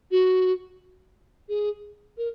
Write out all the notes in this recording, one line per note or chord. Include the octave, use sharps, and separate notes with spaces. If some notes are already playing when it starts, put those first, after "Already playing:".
F#4
G#4
A#4